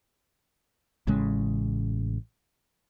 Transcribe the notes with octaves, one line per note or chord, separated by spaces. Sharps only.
A1 A2 C#3 G#3